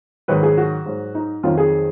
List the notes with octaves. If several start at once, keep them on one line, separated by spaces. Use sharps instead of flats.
G#2 D#3 F#3 B4
G#4
F#4
G#2 F#3
D#4
F2 D#3 F#3 F4
G#4